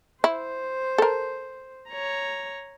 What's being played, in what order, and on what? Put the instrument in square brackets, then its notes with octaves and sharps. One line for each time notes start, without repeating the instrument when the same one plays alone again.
[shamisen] E4 [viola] C5
[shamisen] A4 A#4
[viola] C#5 A#5